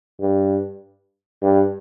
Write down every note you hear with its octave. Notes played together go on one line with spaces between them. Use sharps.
G2
G2